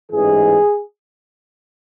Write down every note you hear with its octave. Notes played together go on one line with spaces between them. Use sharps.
A1 G#2 E3 G#4